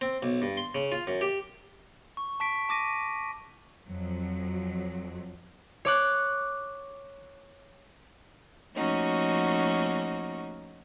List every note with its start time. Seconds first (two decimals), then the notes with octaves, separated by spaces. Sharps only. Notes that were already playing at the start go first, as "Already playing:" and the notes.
0.01 C4
0.23 B1
0.42 G2
0.57 C6
0.75 C#3
0.92 F4
1.07 F#2
1.21 G4
2.17 C#6
2.40 A5 C#6 B6 D7
2.69 A5 D6 A#6 D#7
3.86 F2 F#3
5.85 C#5 D6 F#6
8.75 F3 A3 A#3 C#4 D#4 F#4